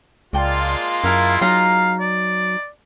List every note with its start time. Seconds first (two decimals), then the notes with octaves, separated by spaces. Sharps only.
0.33 C#2 G#3 A#3 F4 D5 G5 A5
1.04 F#2 E4 A#4 F5 A5
1.42 F#3 D#4 F5 A#5
2.00 D5